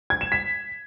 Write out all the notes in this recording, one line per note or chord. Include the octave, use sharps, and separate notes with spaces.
G#6
E7
B6